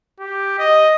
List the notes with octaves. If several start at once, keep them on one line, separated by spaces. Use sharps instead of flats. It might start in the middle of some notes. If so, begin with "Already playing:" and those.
G4
D#5